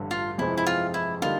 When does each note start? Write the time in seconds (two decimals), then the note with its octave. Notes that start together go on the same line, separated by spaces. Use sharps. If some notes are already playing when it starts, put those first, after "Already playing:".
Already playing: A1 G2 D3
0.11 F4
0.38 F2 C3 E3 G#3 C4 E4
0.58 E4
0.67 F4
0.94 E4
1.22 D3 G3 A#3 D#4 F4